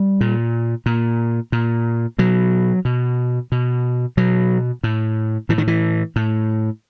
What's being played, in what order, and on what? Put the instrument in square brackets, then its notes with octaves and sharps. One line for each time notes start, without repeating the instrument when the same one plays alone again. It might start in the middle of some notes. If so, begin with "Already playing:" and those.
Already playing: [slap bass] G3
A#2
A#2
A#2
B2 F#3
B2
B2
B2 F#3
A2
A2 E3
D#3
E3
A2